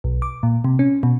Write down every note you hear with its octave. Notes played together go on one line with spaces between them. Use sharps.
B1
D6
A#2
C3
C#4
B2